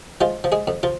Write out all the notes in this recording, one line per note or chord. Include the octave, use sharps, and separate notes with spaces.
F3 G#3 F4
F3
G#3 G#4
F2
F3 F4